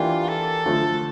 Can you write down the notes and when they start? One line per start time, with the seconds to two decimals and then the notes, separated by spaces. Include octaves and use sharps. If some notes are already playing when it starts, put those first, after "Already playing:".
Already playing: E3 A#3 D4 F4 G4
0.29 A4
0.66 D3 F3 A3